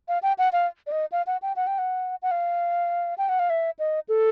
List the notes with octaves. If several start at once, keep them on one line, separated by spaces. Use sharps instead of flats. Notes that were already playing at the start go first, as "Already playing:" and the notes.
F5
G5
F#5
F5
D5
D#5
F5
F#5
G5
F#5
G5
F#5
F#5
F5
G5
F#5
F5
E5
D#5
A4